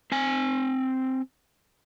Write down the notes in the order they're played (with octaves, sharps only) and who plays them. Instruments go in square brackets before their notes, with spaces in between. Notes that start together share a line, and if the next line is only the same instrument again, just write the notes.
[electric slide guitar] C4 G#5